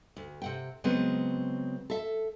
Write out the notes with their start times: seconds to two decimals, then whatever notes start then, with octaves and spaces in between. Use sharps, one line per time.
0.16 D2
0.42 C3 F#5 G5
0.84 C#3 F#3 G#3 B3 C4
1.90 A4 E5